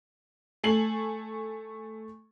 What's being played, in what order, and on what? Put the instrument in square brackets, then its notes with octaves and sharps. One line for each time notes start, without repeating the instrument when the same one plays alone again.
[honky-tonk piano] A3 A4 G#5 C7 F#7